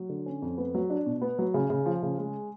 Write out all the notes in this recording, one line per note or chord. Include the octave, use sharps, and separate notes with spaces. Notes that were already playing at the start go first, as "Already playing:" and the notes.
Already playing: F#3
D3
C#4
F2
B3
F#3
D4
B2
B3
F#3
C#3
C#3
F3
C#3
G#3